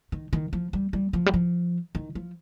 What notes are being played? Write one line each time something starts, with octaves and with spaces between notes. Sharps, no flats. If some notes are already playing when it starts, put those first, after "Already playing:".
D#3
D#3
F3
G3
G3
F3
G3
F3
D#3
F3